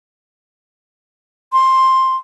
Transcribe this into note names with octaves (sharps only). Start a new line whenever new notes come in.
C6